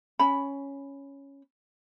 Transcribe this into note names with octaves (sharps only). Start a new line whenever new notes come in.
C#4 B5